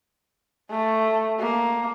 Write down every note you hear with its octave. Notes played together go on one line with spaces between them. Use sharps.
A3
A#3